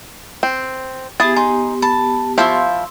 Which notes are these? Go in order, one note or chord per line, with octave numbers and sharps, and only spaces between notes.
C4
B3 E4 G4 G#4 D#6 A6
D#4 G#5 C6
A5 B5
F3 E4 F4 C5 C6 C#6 E6